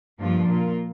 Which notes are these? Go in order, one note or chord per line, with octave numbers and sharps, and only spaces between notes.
G2 F3 A#3 D4 F4
A#2 A#3 F4